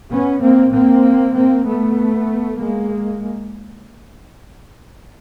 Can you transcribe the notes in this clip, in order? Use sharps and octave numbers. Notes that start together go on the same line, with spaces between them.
B3 C#4
A#3 C4
A#3 C4
A#3 C4
A3 B3
G#3 A#3